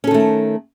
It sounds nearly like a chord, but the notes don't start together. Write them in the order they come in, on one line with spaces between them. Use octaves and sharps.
C#4 A4 D#3 A3